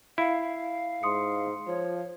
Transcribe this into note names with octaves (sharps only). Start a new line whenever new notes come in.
E4 F5
G#2 C6 D#6 C#7
F3 C#5